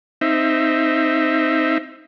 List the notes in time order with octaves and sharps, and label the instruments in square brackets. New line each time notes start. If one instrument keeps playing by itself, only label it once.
[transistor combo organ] C4 D#4 E5